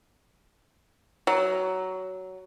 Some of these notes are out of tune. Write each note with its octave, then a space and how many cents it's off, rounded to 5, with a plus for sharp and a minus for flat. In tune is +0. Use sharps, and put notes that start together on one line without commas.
F#3 +15